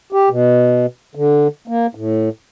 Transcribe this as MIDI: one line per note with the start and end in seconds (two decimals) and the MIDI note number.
0.13 0.29 67
0.29 0.86 47
1.15 1.48 50
1.68 1.86 58
1.95 2.29 45